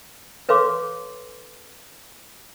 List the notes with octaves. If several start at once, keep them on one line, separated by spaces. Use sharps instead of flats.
A4 B4 C#5 F5 C6 D6